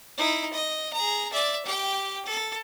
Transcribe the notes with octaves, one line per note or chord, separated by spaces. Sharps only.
D#4 E4
D#5
G#4 A#5
D5 E5
G4 G5
A4